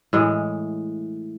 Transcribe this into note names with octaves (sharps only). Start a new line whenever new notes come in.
A2 E3 G#3